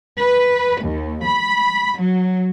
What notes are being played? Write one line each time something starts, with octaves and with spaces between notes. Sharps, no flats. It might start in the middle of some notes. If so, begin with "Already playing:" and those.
B4
D#2
B5
F#3